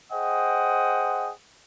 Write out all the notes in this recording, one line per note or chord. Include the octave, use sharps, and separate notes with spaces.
G#4 C5 D#5 F#5 G5 D#6